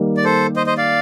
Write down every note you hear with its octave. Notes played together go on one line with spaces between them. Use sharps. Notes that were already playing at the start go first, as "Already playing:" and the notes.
Already playing: D#3 G3 A#3
D5
A4 C5
C5 D#5
C5 D#5
D5 F5